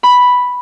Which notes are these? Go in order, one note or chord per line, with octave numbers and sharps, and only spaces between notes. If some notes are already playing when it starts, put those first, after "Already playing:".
B5